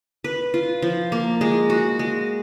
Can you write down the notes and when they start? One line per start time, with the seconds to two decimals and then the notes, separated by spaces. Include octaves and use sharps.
0.24 B4
0.54 F4
0.82 F3
1.12 A#3
1.41 G#3
1.70 F#4
1.99 G#3